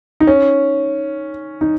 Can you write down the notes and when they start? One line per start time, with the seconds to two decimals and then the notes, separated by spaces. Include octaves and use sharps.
0.20 D#4
0.27 C#4
1.61 D#4